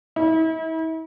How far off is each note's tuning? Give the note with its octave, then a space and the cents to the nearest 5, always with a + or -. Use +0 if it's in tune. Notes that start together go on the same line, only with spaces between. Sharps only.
E4 -40